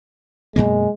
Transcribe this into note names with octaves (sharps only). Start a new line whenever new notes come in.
F#2 B2 G#3 A#3